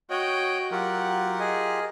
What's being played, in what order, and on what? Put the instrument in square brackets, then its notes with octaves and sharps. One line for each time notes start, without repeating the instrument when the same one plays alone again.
[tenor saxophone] F#4 [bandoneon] C#5 D#5 [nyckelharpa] G5
[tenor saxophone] F#3 [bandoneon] F4 G4 A#4 [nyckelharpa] F#5
[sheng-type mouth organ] G#4 D#5 G#5